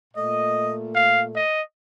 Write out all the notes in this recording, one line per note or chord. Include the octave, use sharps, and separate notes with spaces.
A#2 A3 D#5
F5
D#5